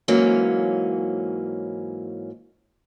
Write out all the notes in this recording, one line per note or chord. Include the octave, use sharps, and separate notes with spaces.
G#2 E3 F#3 A#3 C#4